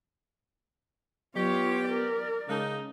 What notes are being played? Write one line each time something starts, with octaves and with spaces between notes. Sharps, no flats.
F#3 B3 F4 G4 C#5
A#4 D5
C#3 G#3 D#4 A5